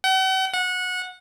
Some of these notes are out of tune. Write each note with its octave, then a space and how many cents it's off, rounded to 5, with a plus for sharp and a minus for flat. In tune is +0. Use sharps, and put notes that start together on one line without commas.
F#5 +45
F#5 -20